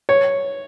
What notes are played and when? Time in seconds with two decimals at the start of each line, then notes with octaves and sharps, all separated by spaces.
0.09 C#5